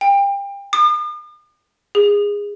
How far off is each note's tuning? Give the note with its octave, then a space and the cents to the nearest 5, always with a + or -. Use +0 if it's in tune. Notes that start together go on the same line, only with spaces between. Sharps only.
G5 +30
D#6 -45
G#4 -20